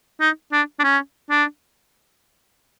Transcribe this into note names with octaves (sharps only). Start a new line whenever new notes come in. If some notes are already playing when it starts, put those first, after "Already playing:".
D#4
D4
D4
C#4
D4